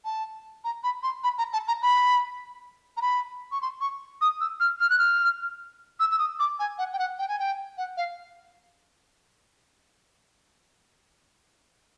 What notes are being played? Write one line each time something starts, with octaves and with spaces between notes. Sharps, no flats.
A5
A#5
B5
C6
B5
A#5
A5
A#5
B5
A#5
B5
C#6
C6
C#6
D#6
E6
F6
F6
F#6
F6
E6
E6
D#6
D6
G#5
F#5
G5
F#5
G5
G#5
G5
F#5
F5